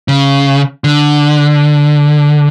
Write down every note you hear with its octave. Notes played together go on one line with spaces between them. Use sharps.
C#3
D3